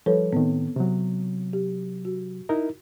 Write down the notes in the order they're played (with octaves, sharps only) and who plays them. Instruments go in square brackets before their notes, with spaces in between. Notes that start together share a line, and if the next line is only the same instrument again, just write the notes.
[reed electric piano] F3 G3 [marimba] A4 B4 C#5
[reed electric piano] A2 D#3 [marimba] B3 C4
[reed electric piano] C3 F#3
[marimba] G4
F#4
[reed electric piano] D#4 E4 A#4